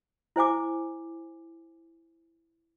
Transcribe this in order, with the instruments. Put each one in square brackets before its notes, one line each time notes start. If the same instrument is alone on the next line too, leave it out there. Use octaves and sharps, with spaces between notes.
[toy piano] E4 C5 G#5 D6